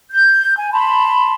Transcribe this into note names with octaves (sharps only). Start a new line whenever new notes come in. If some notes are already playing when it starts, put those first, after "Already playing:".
G6
G#5
A5 B5 C6